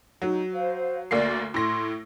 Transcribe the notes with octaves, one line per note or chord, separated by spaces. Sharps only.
F#3 D#4
C5 F5
D2 A#3 D5 C7
A2 C6 A#6